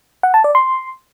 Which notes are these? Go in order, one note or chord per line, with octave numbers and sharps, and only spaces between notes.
F#5
A5
D5
C6